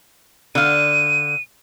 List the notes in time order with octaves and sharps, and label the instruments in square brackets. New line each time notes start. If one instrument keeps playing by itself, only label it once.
[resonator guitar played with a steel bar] D3 F5 [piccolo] D#7